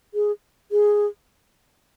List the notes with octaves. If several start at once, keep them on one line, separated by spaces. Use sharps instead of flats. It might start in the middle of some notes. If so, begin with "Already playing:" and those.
G#4
G#4